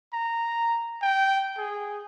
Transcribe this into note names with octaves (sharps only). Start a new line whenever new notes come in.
A#5
G5
G#4